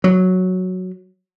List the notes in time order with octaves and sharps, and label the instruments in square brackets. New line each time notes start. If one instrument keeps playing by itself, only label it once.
[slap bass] F#3